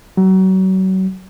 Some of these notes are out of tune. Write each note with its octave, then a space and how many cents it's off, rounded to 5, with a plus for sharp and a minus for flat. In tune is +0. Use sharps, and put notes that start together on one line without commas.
F#3 +30